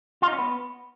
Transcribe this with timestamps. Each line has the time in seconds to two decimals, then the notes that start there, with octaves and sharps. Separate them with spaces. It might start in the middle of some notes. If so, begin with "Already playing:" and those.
0.22 F4
0.27 D#4
0.33 C#4
0.38 B3